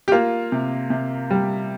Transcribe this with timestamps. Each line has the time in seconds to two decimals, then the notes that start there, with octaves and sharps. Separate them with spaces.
0.08 G4
0.12 A#3 F4
0.52 C3
0.90 C3
1.31 G3